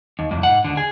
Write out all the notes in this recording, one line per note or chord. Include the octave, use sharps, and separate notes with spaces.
D#2
C2 F2
G#2 F#5
D#2 D3
G#4